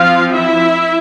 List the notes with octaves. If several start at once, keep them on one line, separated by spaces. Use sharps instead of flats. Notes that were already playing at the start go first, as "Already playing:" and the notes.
Already playing: F3 C4 F4 F5
E4 E5